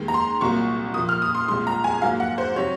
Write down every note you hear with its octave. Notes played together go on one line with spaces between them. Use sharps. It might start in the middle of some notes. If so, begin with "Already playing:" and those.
Already playing: D#2 D#3 G#3
A#5
C6
C2 A#2 F#3 A#3 C#6
A#2 F3 A#3 D#6
F6
D#6
C6
C2 A#2 G#3 C6
A#5
G#5
G#2 F#3 A#3 F5
F#5
C5
C3 F#3 C#5